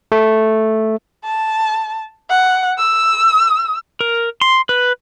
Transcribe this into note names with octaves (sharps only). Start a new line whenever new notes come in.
A3
A5
F#5
E6
A#4
C6
B4